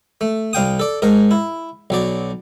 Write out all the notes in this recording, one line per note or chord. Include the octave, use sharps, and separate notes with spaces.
A3
C2 F5 G5 D#6
A4 D5
G#2 A#4
E4
B1 F#3 D5